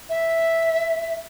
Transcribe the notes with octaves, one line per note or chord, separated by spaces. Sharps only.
E5